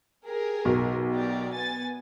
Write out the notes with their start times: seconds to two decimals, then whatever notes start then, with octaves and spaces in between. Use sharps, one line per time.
0.24 G4 G#4 A#4
0.65 B1
1.13 G4 A#4 D5
1.54 B3 G#5 A6